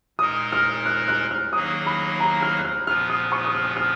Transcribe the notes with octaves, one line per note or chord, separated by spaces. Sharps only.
A#2 G#3 D#4 A#4 D#6
F6
F#6
F#6
F6
D#3 F#3 A#3 D#4 G#4 D#6
B5
A#5
F6
F#6
F6
A#2 F3 B3 F6
D#6
C#6
D#6
F6
F6